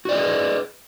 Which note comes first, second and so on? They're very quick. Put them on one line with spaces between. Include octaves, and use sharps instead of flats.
F#4 D5 D#5 G#4 B4